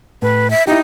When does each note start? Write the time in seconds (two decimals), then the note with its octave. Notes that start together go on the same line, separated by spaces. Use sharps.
0.22 A2 B4
0.50 E5
0.67 D#4 E4 G4